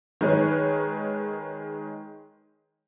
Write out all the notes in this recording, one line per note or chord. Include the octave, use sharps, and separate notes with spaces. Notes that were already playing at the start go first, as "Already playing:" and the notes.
D#3 G#3 B4 C#5